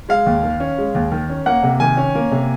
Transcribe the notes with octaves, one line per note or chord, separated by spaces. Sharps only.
G#3 F5
D#2
D#3
C#4
G#3
D#2
D#3
C#4
A#3 F#5
C3
D#3 G#5
C#4
A#3
C3